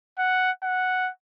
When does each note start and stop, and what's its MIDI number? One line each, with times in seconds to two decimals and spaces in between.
0.19 0.51 78
0.63 1.10 78